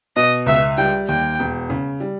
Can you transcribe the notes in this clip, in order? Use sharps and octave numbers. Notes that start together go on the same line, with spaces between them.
B2 D#5
C#2 E5
G3 G5
D#2 G5
E1
C#3
G3